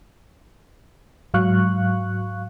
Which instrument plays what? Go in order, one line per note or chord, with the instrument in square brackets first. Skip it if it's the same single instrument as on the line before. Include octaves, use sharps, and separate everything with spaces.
[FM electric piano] G#2 F#3 F5 C#6 F#6